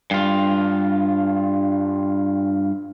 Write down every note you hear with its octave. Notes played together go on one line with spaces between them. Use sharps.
G2 F4